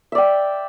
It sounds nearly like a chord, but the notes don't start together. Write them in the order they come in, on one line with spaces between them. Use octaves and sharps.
E5 D5 G5